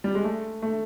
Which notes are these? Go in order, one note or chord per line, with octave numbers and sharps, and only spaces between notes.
G3
G#3
A3
A3